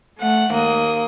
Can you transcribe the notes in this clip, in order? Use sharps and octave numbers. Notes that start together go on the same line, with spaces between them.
A3 F#5
D#2 A#3 D#6